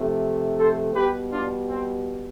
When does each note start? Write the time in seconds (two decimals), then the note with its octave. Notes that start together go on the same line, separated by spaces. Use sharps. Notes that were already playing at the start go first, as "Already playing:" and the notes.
Already playing: C3 F3 A3
0.57 A4 C5
0.94 B2 G3 G4 B4
1.30 D4 F4
1.67 C4